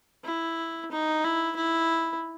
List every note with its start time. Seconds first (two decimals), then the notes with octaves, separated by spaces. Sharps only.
0.24 E4
0.91 D#4
1.24 E4
1.56 E4